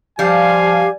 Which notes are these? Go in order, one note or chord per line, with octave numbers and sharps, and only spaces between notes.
F3 G3 G4 F5 G#5